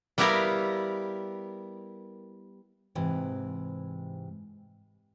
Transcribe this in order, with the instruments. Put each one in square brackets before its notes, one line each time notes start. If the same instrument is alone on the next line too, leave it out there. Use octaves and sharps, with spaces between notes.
[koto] G3 B3 E4 G4 A#4 F5
[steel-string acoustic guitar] G#2 C3 E3